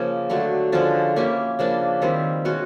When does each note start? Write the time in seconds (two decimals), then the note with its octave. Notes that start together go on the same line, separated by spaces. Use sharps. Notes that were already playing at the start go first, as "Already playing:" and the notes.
Already playing: C#3 F3 A#3
0.30 D3 F#3 A3
0.72 D3 F3 G#3 C#4
1.16 A#3 C#4 E4 G4
1.59 C#3 F3 A#3 D4
2.02 D#3 G3 C4 E4
2.45 B2 G#3 C#4 F#4